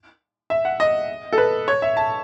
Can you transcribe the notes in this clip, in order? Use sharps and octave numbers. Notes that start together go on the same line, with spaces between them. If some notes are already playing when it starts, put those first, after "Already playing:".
E5
F#5
D#5
A4
B4
C#5
E5
A5